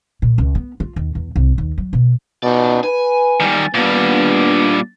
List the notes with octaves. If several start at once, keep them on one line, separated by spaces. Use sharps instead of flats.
A#2
C#2
B3
F4
D#2
E2
C2
D#2
F#3
B2
B2 D#4 D5
B4 G#5
D#3 G3
A#2 G3 B3 D4 D5